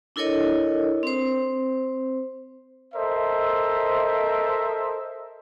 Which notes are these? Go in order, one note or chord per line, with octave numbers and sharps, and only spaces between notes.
D4 E4 A4 A#4 C#5 D#5
C4 C5
A4 A#4 C5 D#5 E5